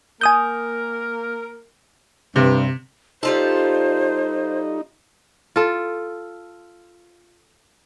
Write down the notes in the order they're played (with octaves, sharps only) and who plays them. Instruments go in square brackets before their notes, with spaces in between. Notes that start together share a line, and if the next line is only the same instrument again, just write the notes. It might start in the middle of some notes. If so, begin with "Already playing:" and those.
[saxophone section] A#3 A#4 [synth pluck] G#5 D#6 G6
[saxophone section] G2 [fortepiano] C3
[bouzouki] G3 F4 A4 [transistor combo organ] D#4 [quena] C5
[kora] F4 A4